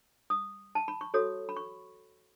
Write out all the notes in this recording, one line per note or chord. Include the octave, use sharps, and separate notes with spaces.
D#6
A5
B5
C#6
F#4 A4 C#5 D#6
B5
C#6